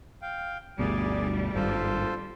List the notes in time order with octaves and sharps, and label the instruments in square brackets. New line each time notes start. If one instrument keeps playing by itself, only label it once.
[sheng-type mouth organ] F5 G5
[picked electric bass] G1 D2 B2 [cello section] G3 [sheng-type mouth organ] G#4 D5
[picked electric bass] G#1 G2 [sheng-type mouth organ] F4 A4 C5